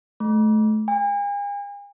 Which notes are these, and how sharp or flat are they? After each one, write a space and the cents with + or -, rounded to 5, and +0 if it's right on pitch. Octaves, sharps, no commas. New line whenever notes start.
A3 -25
G#5 -40